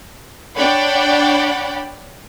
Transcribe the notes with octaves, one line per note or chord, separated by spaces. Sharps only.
D4 C#5 D5 F#5 G5 B5